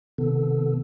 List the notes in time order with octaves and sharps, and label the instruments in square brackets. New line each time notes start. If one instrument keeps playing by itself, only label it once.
[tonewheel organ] C3 D#3 B3 A4